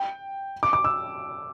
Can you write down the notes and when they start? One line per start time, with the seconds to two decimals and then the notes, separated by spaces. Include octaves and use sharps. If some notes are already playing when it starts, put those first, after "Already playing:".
Already playing: G5
0.63 D6
0.73 D6
0.84 E6